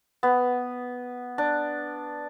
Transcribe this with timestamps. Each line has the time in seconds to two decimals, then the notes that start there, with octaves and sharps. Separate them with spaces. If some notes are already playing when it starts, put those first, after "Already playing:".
0.23 B3
1.38 D4